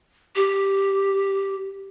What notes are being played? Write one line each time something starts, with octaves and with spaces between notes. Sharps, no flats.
G4